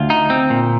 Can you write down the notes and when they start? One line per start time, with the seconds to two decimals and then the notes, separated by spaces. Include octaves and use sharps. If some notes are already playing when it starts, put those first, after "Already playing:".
Already playing: D2 F4
0.10 D#4
0.30 C4
0.50 A#2